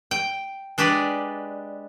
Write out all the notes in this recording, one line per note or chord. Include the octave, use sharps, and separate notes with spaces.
G5
G#3 D4 G4 B4 D5